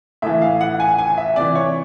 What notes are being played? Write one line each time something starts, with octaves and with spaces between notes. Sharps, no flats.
A2 E3 E5
F5
F#5
G#5
G#5
E5
C3 E3 D5
C#5